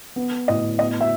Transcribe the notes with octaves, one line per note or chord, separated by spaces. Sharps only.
B3
A2 D#5
B3 D#5
E5